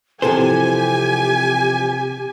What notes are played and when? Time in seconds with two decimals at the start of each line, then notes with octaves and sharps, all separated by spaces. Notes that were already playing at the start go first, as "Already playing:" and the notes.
0.22 C3 E3 F3 G4 A4 C5 G#5